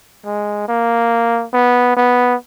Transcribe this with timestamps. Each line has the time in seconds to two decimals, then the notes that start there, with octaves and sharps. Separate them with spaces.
0.26 G#3
0.68 A#3
1.53 B3
1.97 B3